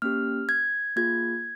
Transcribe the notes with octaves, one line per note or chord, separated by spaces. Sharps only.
A#3 C#4 G4 F6
G#6
A#3 F4 G#4 G#6